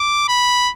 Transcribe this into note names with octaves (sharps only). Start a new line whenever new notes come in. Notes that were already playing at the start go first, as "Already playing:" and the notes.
Already playing: D6
B5